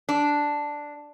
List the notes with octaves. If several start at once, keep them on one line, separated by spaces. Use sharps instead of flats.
D4